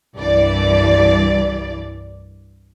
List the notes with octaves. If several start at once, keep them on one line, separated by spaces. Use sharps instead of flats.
C2 G2 E3 D5